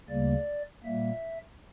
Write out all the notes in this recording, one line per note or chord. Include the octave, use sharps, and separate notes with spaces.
D2 C#3 G3 A#3 D5
A#2 G3 A#3 E5